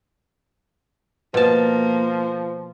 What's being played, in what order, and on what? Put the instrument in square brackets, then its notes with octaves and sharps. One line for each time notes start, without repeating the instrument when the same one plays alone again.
[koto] B2 A5 [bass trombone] F3 [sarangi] A#3